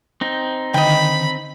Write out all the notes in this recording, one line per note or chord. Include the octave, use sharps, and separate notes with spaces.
C4 D#4
D3 D#3 D#5 G5 B5